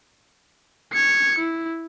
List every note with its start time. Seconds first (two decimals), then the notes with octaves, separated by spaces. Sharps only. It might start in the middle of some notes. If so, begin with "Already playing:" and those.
0.93 G#6 C#7
1.38 E4